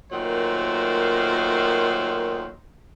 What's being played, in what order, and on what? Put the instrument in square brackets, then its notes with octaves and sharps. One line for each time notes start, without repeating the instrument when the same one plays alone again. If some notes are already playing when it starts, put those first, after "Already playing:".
[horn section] A#2 D#3 F#3 A3 C5